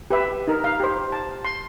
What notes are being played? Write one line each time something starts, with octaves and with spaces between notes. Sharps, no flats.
G4 B4 E5
D#4 A#4
F5
G4 C5
A5
C6